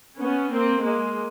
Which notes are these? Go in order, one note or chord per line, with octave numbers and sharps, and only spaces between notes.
B3 C#4
A#3 C4
G#3 A#3